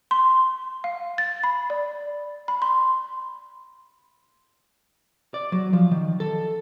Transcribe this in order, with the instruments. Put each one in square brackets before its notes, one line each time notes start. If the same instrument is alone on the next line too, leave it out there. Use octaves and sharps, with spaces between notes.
[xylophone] C6
F5
A6
B5
D5
B5
C6
[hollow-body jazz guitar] D5
F#3
F3
D#3
A4